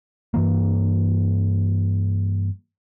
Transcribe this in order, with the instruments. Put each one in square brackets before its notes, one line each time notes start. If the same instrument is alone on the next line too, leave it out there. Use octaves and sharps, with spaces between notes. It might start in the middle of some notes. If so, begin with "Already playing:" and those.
[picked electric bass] G2 E3 A#3